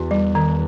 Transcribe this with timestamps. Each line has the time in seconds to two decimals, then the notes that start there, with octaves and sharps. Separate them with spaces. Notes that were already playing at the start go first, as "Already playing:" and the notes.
Already playing: E2 F#4
0.11 G3
0.35 D#3